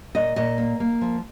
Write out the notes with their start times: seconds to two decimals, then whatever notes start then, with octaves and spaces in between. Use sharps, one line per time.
0.15 A#2 D#5
0.36 A#2 D#5
0.58 A#3
0.80 A#3
1.01 F3